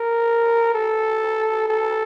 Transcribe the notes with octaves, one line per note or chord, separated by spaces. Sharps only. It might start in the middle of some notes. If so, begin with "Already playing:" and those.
Already playing: A#4
A4
A4